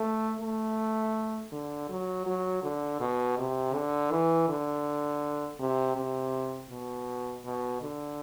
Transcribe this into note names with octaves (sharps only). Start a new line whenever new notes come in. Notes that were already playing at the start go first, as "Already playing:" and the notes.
Already playing: A3
A3
D3
F#3
F#3
D3
B2
C3
D3
E3
D3
C3
C3
B2
B2
D3